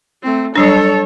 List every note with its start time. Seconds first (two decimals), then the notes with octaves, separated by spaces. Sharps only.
0.23 A3 C4
0.56 F#3 G3 D4 A4 C#5